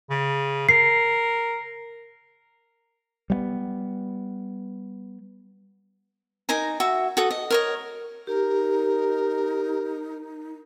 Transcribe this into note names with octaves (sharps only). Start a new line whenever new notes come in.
C#3
A#4 C7
G3 A3 B3
D#4 A#4 G#5 A#5
F#4 E5
F#4 A4 D#6
D#5
A#4 C#5 D#5
D#4 G4 A#4